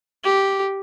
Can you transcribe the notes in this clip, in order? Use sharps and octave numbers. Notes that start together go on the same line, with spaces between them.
G4